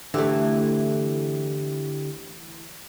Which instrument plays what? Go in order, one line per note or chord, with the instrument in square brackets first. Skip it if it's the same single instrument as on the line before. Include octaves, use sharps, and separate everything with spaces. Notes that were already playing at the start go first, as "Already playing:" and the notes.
[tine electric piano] D3 G4 [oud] E3 A3